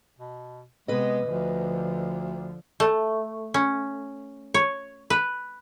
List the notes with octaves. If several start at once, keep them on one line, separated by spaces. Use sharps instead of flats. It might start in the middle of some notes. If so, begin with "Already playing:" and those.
B2
C3 G#3 B3 B4 D#5
D2 D3 F3
A3
C#4
C#5
B4